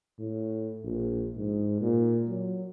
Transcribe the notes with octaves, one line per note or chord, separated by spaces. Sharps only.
A2
A#1
G#2
A#2
F#3